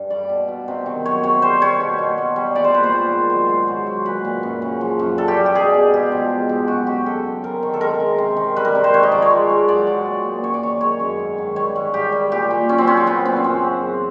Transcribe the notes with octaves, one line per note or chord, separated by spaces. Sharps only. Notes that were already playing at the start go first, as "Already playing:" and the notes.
Already playing: G2
G3 D5
B2
B2
C3
D#3
F#3 C#5
C3 C#5
G3 C5
G3 C#5
B2
B2
G3
G3
A#2 D5
C5
A#2 B4
C5
G#2
D#3
F#3 C5
G#2
F#3
F#3
A#2 B4
A#2
F#2
C#3
F3
F#2
G3 A4
G4
G3
G4
B2 G#4
B2
G#2 G4
F3
G#3
G#2
F#2 F#4
C#3 G4
F#3 A4
F#2
C3 A#4
D#3
A4
G#3 A#4
C3
C3
D#3
G3 B4
A#4
C3
C5
G#2 C#5
D#5
F3 D5
C#5
G#3
G#2
F#3 D5
F#3
A#2
A#2
F#2 C#5
D5
D#3 C#5
G#3 C#5
F#2
G#2
D#3
G3 C#5
G#2
G3 G4
G3
A#2 G4
A#2
F#3 C#4
C4
F#3 C#4
C4
A#2 B3
A#2 C4
C#4
F#2 C4
C#3
E3